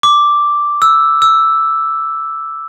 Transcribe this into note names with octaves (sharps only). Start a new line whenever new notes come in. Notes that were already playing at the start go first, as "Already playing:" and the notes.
D6
E6
E6